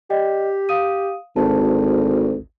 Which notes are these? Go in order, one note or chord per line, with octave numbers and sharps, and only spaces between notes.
G4 D5 D#5 G5
F5 D#6 D#7
G#1 D2 A5